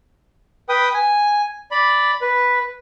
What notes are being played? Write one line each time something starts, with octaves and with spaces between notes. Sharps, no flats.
B4 G5 D#6
G#5
D5 B5
B4